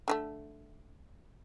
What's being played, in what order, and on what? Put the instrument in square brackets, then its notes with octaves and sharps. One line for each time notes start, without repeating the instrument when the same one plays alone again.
[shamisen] D3 F3 A3